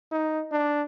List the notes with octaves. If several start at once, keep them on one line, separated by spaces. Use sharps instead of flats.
D#4
D4